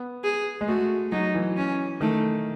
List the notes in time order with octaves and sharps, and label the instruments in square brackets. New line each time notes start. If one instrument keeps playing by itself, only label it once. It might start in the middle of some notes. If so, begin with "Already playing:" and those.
Already playing: [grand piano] B3
[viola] G#4
[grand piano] G#3
[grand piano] A3 [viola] F#4
[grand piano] F#3 [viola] D#4
[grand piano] E3
[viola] C#4
[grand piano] D#3 [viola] A3